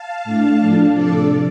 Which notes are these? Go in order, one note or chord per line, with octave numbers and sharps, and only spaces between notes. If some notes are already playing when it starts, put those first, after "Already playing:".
Already playing: F5 A5
A2 A3 D4
A2 F3 D4
C3 F3 D4 A4 D5